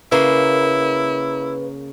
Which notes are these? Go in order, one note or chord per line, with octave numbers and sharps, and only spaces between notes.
C#3 A#3 E4 B4